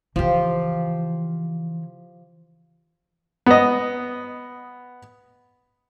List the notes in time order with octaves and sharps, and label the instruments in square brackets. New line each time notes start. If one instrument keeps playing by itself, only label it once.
[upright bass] C#3 E3 [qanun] F3 F4 G4
[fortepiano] B3 D#5